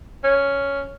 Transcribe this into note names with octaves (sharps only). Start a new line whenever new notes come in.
C#4